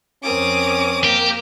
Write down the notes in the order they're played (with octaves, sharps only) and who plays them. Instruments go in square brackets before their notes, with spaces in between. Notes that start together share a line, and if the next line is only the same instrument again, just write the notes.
[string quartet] F2 C4 A#4 [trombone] C#4 [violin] D6 D#6
[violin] A#3 [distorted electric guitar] G4